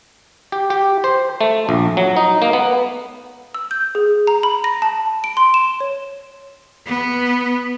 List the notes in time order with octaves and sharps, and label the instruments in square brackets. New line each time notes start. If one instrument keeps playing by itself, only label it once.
[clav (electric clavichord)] G4
G4
C5
A3
A#1
F#3
D#4
A#3
B3
[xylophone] E6
G6
G#4
A#5
B5
A#6
A5
D7
C6
E7
C#5
[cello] B3